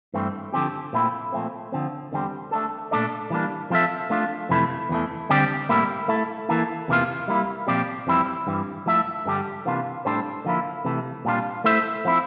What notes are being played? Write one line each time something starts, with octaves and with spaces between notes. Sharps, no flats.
G2 E3 A3 C4
D3 F3 C4 G4
A#2 A3 C4 E4
A#2 F3 A3 C4
D3 F3 C4
E2 D3 G3 C4
A3 D4 A4
A#2 A3 D4 A4 D5
E3 G3 A#3 D4
F3 C4 F4 A4 E5
A3 D4 F4
F2 C3 E3 A3 E4
E2 E3 A3
D3 G3 C4 G4 D5
A2 G3 A#3 E4
A3 E4 A4
E3 A#3 E4 A4
E2 C3 E3 A#3 F4
G3 A#3 E4
A#2 F3 C4 G4 D5
F2 E3 G3 C4 E4
G2 E3 G3
F3 A3 E4 A4 E5
G2 D3 G3 D4 G4
C3 E3 A#3 D4 F4
A2 G3 D4 A4 C5
D3 F3 A#3 E4
C3 E3 A3
A#2 G3 D4 F4
A3 E4 A4 C5 E5
F3 C4 E4